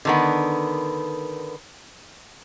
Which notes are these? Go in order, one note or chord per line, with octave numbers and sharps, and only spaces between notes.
D3 D#3 B3